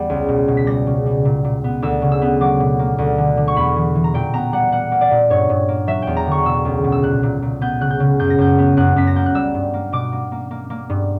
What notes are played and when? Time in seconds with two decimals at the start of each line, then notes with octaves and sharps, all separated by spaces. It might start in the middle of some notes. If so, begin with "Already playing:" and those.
Already playing: E2 G3 B3
0.10 C#2
0.29 B2
0.48 B2
0.57 B6
0.67 G3 A#6
0.87 C#3
1.06 G3
1.25 A#2
1.44 A#2
1.64 B3
1.82 D2 E6
2.02 C#3
2.12 E6
2.22 B3
2.41 F#3 D6
2.60 B2
2.79 A#3
2.98 D2
3.18 D3
3.37 D3
3.48 C#6
3.56 E2 B5
3.76 E3
3.95 E3
4.04 A#5
4.14 A#2 G5
4.34 B3 A#5
4.53 G3 F#5
4.72 A#3 F#5
4.92 A#3
5.01 D5
5.11 A#2
5.30 G2 C#5
5.49 G2
5.68 A#3
5.87 F#3 E5
6.02 E2 G5
6.17 A#5
6.27 D3 C#6
6.45 B2 E6
6.65 C#2
6.84 B2
6.92 E6
7.03 A#2 F#6
7.23 A#2
7.42 A#2
7.61 B3 G6
7.81 C#3 F#6
7.91 G6
8.00 C#3
8.19 F#2 G6
8.30 A#6
8.38 F#2 G6
8.58 B3
8.77 F#2 F#6
8.96 F#2 B6
9.07 A#6
9.16 A#3 G6
9.26 F#6
9.35 G3 E6
9.54 G2
9.74 A#3
9.92 B2 D6
10.12 A#3
10.32 A#3
10.51 A#3
10.70 A#3
10.90 G2